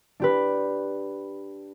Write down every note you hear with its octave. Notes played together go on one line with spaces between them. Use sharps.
D4 G4 B4